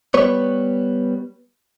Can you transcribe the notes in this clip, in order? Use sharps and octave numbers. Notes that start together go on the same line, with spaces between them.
G3 B3 B4 C#5